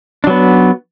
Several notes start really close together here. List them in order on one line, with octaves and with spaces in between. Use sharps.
D4 F#3 B3